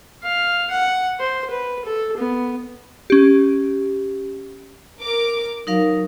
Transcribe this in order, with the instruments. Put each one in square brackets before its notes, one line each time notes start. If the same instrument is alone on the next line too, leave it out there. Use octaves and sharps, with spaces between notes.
[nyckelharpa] F5
F#5
C5
B4
A4
B3
[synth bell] C#4 G4
[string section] A#4 D6
[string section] F#3 [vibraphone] D#4 A#4 F5